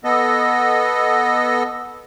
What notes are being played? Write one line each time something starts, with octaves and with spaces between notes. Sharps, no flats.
B3 A4 D#5